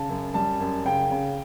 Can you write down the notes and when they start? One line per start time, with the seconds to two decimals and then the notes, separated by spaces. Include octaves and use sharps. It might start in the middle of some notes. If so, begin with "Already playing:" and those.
Already playing: C#3 A5
0.09 F#2
0.34 G3 A5
0.60 F#2
0.85 C#3 G5
1.11 C#3